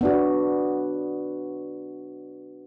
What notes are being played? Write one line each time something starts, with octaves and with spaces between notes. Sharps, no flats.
B3 D4 F#4